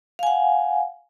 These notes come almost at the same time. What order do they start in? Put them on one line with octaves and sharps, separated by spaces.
F5 G#5 F#5